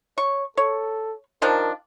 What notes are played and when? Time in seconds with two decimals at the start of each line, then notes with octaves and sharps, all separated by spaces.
0.18 C#5 C#6
0.57 A4 C#5
1.42 D#3 F3 D4 A#4